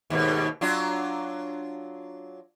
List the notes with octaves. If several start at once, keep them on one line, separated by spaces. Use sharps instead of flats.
D#2 G#2 B2
F#3 D4 F4